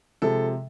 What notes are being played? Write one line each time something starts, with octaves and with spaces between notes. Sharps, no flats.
C3 F3 G#3 A4